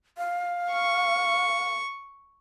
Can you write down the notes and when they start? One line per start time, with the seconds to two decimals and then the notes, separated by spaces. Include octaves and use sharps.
0.18 F5
0.71 C#6